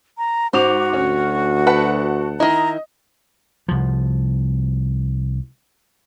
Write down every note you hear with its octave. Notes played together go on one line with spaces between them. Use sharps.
A#5
G#2 F#4 C5 D6 F7
D2 C#4
B4 F#5 A5
D#3 E4 D#5 A#5
C2 F3